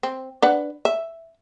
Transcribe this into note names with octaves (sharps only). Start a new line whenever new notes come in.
C4
D4 B4 F#5
E5